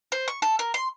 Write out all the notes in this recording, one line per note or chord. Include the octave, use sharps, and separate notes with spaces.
C5
C#6
A4
A#4
C6